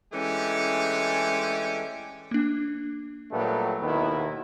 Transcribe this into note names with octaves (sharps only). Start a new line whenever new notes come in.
E3 G#3 A3 C#4 D4 G4
A#3 D4
A#2 F#3 G3 A3 B3
D#2 B2 D#3 B3 E4